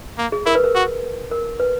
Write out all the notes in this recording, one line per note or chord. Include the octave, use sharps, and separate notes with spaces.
A#3
G#4
E4 A#4
B4
A#4
F#4
A#4
B4